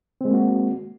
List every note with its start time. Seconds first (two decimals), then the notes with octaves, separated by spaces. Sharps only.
0.21 C4
0.25 G#3
0.29 A#3
0.33 F#4